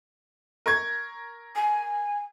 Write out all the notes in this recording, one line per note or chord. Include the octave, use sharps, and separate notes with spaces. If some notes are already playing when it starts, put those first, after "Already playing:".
A#4 C#6 G#6
G#5